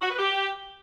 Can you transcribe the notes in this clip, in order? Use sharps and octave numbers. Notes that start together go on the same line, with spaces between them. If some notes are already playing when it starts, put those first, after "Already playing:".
F#4
B4
G4